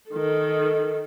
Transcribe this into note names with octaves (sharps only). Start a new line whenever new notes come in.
D#3 A4